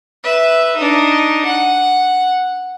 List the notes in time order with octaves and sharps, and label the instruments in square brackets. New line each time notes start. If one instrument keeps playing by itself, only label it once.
[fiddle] B4 E5
D4 D#4
F#5